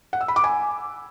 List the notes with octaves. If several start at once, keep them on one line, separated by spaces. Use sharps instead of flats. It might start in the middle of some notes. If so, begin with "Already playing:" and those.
F#5
E6
B5
D6
G#5